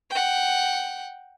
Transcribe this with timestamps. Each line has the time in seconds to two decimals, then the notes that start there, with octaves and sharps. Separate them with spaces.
0.10 F#5 G5